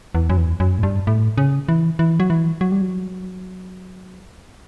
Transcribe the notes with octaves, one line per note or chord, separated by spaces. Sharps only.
E2
F#2
E2
F#2
A2
G2
A2
C#3
E3
E3
F#3
E3
F#3
G3
F#3